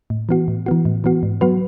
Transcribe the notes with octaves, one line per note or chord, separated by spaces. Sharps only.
A2
E3 B3 F#4
A2
E3 B3 F#4
A2
E3 B3 F#4
G#2
F#3 B3 F#4 B4